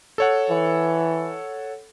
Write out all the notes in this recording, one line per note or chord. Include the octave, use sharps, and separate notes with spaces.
A4 C#5 F#5
E3